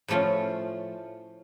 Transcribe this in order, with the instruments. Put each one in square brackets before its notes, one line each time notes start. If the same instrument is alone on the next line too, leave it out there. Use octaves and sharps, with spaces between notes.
[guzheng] A2 F3 A3 C#4 F4